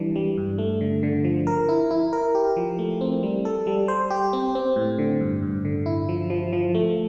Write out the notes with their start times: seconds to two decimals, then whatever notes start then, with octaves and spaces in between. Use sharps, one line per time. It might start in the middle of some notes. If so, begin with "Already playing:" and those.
Already playing: E3 G3 D4
0.16 G3
0.37 G2
0.58 A3
0.81 D3
1.03 D3
1.24 F3
1.47 A#4
1.69 E4
1.91 E4
2.13 A#4
2.35 G4
2.56 F3
2.79 A3
3.01 C4
3.23 G3
3.45 A4
3.67 G3
3.88 C5
4.10 G4
4.33 C4
4.55 C4
4.76 A2
4.98 D3
5.21 G2
5.43 G2
5.65 D3
5.86 E4
6.09 F3
6.30 F3
6.53 F3
6.75 A3